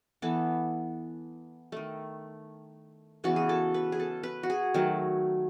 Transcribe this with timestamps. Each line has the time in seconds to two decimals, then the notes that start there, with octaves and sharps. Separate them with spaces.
0.22 E3 B3 A4
1.72 D#3 A3
3.24 C#3 E3 B3 F#4
3.36 G#4
3.49 A4
3.74 B4
3.92 G#4
4.00 A4
4.23 B4
4.43 F#4
4.50 G#4
4.74 D#3 F#3 A3